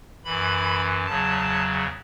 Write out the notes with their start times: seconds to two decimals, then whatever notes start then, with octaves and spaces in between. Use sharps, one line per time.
0.25 F#2 E3 B5
1.06 E2 C#3 F#3 A5